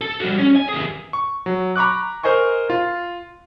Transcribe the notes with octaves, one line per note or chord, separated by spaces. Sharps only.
A4 A5
G3 F#4
C#4
G#5
D#2 G#4
C#6
F#3
A#5 B5 C#6 D6 F#6
A#4 C5 D#5 G#5 C#6
F4